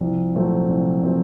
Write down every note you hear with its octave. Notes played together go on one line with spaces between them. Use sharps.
C2 F3
A#2 F#3 A3 C4
C2
A#2 F#3 A3 C4